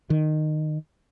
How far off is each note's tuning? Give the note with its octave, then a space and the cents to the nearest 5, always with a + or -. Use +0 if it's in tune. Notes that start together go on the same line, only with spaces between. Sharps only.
D#3 -15